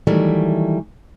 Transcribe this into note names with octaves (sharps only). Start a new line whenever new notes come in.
D#3 E3 F#3 G3 A3